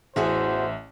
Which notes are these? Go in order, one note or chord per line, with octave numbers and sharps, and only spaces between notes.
A1 E2 F#4 G#4 C5 E5